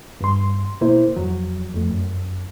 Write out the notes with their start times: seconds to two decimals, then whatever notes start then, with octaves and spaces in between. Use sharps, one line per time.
0.21 G2 C6
0.81 B2 A#3 E4 C5
1.16 F2 F#3
1.75 F2 A3
1.91 F#2